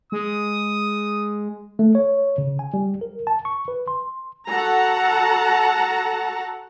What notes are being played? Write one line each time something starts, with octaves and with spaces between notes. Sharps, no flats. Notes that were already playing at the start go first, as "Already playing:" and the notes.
G#3 D#6
A3
C#5
C#3
G#5
G3
A#4
A5
C#6
B4
C6
F#4 A4 F#5 A5 A#5